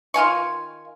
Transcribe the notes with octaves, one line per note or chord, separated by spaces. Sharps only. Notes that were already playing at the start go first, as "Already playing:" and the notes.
D#3 F4 G#5 C#6